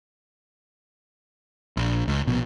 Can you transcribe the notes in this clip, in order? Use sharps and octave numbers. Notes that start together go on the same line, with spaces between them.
A#1
C#2
A#1 B2